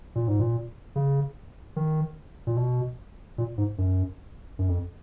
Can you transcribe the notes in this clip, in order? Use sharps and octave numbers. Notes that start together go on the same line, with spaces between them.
A#2
G#2
A#2
C#3
D#3
A#2
B2
A#2
G#2
F#2
F#2
F2